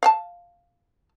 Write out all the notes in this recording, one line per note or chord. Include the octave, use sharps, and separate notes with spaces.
F5 G5 A5